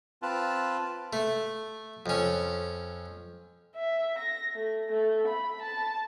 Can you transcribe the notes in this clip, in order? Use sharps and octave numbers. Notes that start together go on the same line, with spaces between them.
C4 F4 B4 A5
A3
F2 C#4
E5
A#6
A3
A3
B5
A5